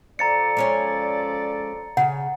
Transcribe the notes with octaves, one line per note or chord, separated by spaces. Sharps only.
F3 A4 D5 A#5 A6 C#7
G#3 C#4 C#5
C#3 F#5